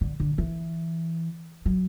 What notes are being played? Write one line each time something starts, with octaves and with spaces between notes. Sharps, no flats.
D3
D3
E3
F#3